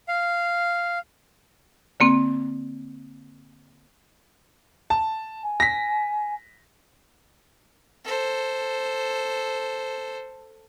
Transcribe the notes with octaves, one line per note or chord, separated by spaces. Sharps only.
F5
D3 A#3 C4
A5
G#5
A#6 B6
A4 C5